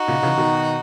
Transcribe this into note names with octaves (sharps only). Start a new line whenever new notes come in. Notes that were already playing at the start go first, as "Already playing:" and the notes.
Already playing: D#4 F#4
A#2 C#3
C#3 E3
B2 D#3